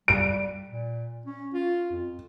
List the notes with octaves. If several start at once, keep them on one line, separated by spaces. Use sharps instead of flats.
G3 D7
A#2
C#4
F4
F2